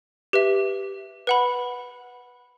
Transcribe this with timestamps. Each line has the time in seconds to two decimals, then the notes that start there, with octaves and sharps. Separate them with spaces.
0.33 G4 B4 E5
1.27 B4 F#5 B5